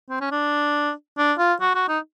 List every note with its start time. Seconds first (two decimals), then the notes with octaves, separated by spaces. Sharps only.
0.10 C4
0.21 C#4
0.31 D4
1.18 D4
1.38 F4
1.61 F#4
1.75 F#4
1.89 D#4